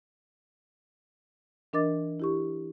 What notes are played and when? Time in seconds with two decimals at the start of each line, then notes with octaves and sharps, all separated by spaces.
1.73 E3 D4 A#4 D#5 D6 A6
2.20 E4 G4 C#6